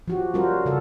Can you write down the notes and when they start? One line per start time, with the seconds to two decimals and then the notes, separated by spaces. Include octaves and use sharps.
0.08 F3 F#4 G4
0.34 G3 C#4 F4 F#4 A#4 C5
0.65 C#3 A4 F5